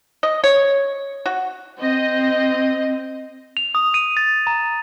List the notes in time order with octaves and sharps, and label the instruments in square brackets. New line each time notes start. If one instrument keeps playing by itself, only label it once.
[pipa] D#5
C#5
F#4
[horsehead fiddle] C4 [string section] D#5
[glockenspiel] F7
D#6
D#7
A6
A#5